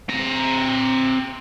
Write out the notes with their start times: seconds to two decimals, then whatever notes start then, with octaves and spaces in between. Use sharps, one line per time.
0.09 C4 A#5